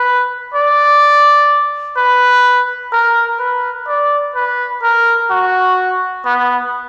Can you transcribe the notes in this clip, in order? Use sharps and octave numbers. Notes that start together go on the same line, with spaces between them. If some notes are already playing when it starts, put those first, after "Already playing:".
Already playing: B4
D5
B4
A#4
B4
D5
B4
A#4
F#4
B3